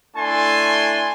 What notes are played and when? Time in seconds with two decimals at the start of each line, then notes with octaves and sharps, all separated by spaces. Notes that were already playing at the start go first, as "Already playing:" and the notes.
0.17 A3 D4 E4 G#5 A5 C6